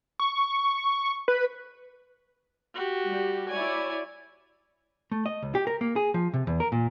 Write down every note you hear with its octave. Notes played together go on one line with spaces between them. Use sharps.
C#6
B4
F#4 G4
G3
E4 C#5 D5 G#5
A3
D#5
C#2
G4
A#4
A#3
G#4
F3
C3
E2
A#4
A#2